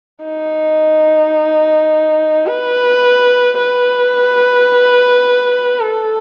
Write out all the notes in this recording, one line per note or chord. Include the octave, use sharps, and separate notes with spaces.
D#4
B4
B4
A4